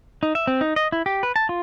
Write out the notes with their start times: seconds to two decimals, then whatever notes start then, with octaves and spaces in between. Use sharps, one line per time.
0.23 D#4
0.35 E5
0.47 C4
0.61 D#4
0.76 D#5
0.92 E4
1.06 G4
1.23 B4
1.36 A5
1.49 F4